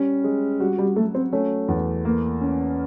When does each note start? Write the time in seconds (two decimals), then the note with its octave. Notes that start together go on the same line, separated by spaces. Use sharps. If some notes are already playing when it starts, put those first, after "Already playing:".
Already playing: G3 C#4
0.24 G#3
0.60 G3 F#4
0.78 G3
0.96 F#3 A3
1.15 C4
1.33 A3 C#4
1.68 E2
2.05 A#3
2.41 C#4